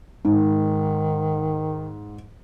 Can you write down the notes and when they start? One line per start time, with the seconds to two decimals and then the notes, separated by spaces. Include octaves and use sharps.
0.25 G#2 D#3